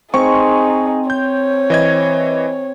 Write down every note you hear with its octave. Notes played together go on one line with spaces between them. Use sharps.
C4 D#4 G#4 C#6
C#5 G6
E3 D#5 G#6